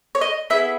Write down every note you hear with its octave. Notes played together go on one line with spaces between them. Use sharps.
C#5
D#5
B3 E4 G#4 E5